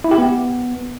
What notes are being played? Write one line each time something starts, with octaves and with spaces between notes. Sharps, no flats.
E4
G4
B3